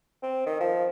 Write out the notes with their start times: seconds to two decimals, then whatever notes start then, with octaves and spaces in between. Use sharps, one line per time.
0.23 C4
0.46 D#3
0.60 F3